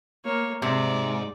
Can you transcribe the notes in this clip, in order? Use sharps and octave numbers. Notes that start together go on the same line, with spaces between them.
A#3 C#5
G#2 C3 D5